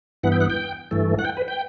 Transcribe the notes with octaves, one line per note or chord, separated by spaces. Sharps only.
G2 E3 B3 F#5
G5
F#5
G5
G2 E3 A3
F#5
G5
B4
G5